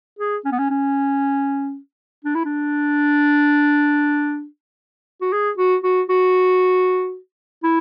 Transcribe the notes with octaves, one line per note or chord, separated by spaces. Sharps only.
G#4
C#4
B3
C#4
C#4
D4
E4
D4
F#4
G#4
F#4
F#4
F#4
E4